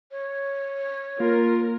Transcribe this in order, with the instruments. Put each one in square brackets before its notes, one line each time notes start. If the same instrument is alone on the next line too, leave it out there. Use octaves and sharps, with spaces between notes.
[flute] C#5
[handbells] A#3 [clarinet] F4 [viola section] A#4